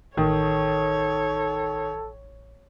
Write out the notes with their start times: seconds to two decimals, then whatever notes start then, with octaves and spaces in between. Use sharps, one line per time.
0.17 A1 D#3 A4 C#5